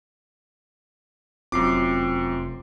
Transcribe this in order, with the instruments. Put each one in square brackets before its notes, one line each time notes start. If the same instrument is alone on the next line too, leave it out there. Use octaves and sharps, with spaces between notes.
[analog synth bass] F1 [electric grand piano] F#2 D6 [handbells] C4 F4 C7